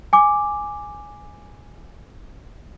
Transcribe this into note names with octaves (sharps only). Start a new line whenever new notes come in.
G#5 D6